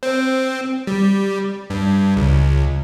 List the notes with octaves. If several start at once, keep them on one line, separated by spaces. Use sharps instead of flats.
C4
G3
G2
C#2